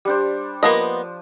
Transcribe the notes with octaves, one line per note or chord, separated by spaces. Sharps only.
G3 D4 C5
F3 A#3 B3 D#5